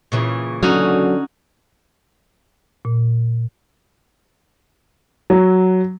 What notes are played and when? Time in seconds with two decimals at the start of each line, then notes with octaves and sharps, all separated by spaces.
0.12 A#2 C#3 E3
0.63 D3 F#3 C#4 D#4 F#4
2.85 A#2
5.30 F#3